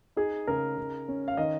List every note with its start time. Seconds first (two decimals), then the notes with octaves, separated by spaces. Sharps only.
0.16 D#4 G#4
0.47 C#3 A#4
0.77 C#3
1.08 C#4
1.28 F5
1.37 D#3 D#5